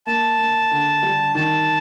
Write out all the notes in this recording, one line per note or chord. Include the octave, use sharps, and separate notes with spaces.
A#3 A5
A#3
D3
G3
D#3 A5